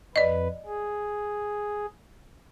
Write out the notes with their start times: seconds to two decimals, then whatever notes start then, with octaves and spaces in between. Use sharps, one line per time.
0.16 F2 B4 D5 D#5
0.66 G#4